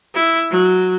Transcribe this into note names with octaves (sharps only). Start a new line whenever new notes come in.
E4
F#3